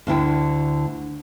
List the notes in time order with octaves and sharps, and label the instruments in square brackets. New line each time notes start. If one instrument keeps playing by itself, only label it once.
[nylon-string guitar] D2 D3 E4 G5